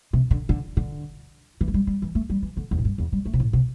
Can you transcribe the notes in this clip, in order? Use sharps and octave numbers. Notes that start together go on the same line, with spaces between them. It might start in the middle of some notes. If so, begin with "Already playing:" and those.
C3
D3
D3
D3
E3
A3
G3
G3
E3
A3
G3
E3
D3
E2
A2
G2
E2
G3
A3
C3
A2
C3